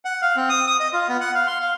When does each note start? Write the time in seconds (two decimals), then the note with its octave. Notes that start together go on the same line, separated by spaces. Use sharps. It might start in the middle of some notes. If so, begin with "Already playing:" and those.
0.05 F#5
0.22 F5
0.36 C4
0.49 D#6
0.67 D#6
0.80 D#5
0.93 F4
1.09 B3
1.21 F#5
1.35 F5
1.47 C6
1.61 F5